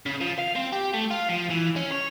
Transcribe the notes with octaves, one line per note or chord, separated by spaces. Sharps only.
C#3
F3
F5
C4
G4
A3
F4
F3
E3
C#4
C#5